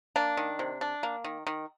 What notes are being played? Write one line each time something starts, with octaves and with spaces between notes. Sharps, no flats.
A#3 D4
D#3
C3
D4
A#3
D#3
D#3